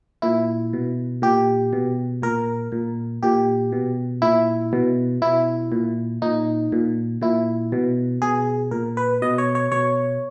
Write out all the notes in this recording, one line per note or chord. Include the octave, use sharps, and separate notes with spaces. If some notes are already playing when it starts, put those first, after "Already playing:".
A#2 E4
B2
A#2 G4
B2
A#2 A#4
A#2
A#2 G4
B2
A#2 E4
B2
B2 E4
A#2
A#2 D#4
A#2
A#2 E4
B2
B2 G#4
A#2 A#4
B4
B2 D#5
C#5
C#5
B2 C#5